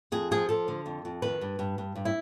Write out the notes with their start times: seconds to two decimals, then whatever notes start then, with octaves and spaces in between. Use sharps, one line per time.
0.12 F2 G#4
0.31 F3 G#4
0.49 F3 A4
0.68 D3
0.86 F2
1.05 F2
1.22 D#3 B4
1.41 G2
1.59 G2
1.78 G2
1.96 G2
2.05 E4